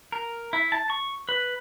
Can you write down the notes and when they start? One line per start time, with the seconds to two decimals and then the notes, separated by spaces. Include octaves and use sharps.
0.12 A#4
0.53 E4
0.72 A5
0.90 C#6
1.29 B4